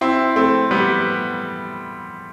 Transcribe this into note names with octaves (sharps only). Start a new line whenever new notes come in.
C4 E4
A3 C4
G3 B3